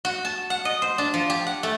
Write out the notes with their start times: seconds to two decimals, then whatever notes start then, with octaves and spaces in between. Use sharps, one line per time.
0.05 F#4
0.25 A5
0.50 F#5
0.65 D#5
0.82 C5
0.98 D4
1.14 F3
1.30 G4
1.47 F#5
1.63 A3